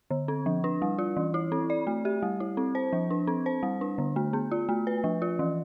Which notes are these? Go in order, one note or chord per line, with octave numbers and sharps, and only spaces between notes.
D3
C4
F3
D4
G3
F4
E3
E4
C4
D5
A3
G4
G3
E4
C4
C5
F3
D4
C4
C5
G3
D4
D3
A3
B3
F4
A3
B4
F3
F4
E3